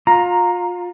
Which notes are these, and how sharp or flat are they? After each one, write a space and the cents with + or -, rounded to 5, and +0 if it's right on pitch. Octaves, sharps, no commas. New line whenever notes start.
F4 +25 A#5 +0